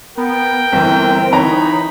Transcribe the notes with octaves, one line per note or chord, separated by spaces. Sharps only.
B3 A#4 G5
G1 E3 C4
E3 D#4 C#5 A#5 B5